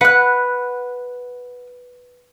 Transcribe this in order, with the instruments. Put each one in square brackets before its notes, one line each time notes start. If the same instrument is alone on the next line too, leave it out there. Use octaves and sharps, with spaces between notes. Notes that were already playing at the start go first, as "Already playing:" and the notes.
[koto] B4 [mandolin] F#5 F#6